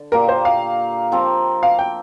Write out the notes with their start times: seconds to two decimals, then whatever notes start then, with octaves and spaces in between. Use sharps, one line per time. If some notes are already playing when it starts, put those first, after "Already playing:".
Already playing: D3
0.12 A#2 A#3 G4 A#4
0.28 C5
0.45 F5
1.12 F3 C4 A#4
1.63 F5
1.79 G5